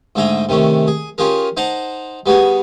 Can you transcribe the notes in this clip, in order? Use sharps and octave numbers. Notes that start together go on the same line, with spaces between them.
G#2 D3 A3 G#4 G5 A#5
C3 D#3 A3 C#4
G#4
C#4 F4 G4 G#4 A#4
D#4 C5 F#5 A5 A#5
G3 B3 F#4 G#4 C#5